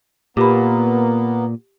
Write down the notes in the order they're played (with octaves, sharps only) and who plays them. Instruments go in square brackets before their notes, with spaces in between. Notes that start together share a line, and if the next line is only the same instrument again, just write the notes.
[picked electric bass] A#2 [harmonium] A#3 B3 [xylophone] G4 B5